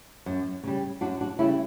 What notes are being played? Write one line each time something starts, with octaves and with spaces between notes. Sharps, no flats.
F#2
C#3 G3
F#2 D4 F#4
D4 F#4
C#3 G3 C#4 E4